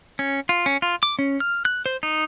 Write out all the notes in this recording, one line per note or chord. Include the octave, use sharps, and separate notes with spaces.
C#4
F4
C#4
F4
D6
C#4
F6
F#6
C5
D#4